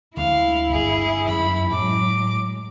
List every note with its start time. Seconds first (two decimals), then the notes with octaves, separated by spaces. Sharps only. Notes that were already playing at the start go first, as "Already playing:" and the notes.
0.17 D2 D3 G#3 E4 F5
0.72 G1 G#4
1.28 F#2 E3 B5
1.71 A2 F#3 G#3 D6